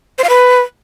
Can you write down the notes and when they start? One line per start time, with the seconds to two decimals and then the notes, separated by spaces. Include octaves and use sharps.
0.18 C5
0.24 F5
0.29 B4